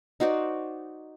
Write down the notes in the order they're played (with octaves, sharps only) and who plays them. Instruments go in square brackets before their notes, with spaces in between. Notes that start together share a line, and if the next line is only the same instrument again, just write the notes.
[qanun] D#4 F#4 C5 D5